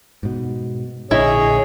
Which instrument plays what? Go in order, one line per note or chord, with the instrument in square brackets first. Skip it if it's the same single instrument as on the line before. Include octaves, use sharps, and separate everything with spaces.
[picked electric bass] G#2 B2
[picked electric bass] A#1 A#2 D3 [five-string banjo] E4 D#5 E5 [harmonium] G#4 C#5